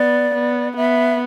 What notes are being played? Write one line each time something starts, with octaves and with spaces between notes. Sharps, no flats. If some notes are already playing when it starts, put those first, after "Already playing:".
Already playing: B3 D5
B3
B3 E5